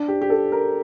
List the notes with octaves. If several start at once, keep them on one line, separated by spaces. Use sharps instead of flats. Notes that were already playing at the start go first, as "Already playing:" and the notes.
Already playing: D4
G4
G4
A4
A#4